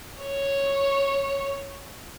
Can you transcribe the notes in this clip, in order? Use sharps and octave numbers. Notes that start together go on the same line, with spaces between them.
C#5